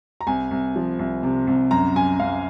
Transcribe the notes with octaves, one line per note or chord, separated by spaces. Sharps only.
A#5
C2 G#5
C2
F3
C2
C3
C2
F#2 A#5
F#2 G#5
F#2 F5